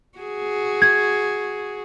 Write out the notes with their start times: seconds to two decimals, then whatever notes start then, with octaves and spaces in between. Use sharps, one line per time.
0.18 F#4 G#4
0.82 G#6